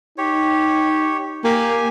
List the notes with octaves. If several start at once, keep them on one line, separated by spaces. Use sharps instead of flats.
D#4 G4 C#5
A#3 G4 G#5